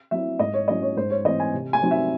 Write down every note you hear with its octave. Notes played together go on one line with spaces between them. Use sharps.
F#3 C4 E4 E5
G#2 D#5
C#5
F#3 C#4 E4 D#5
C#5
G#2 C5
C#5
E3 C4 D#5
G#5
C3
G#5
F#3 C4 D#4
E5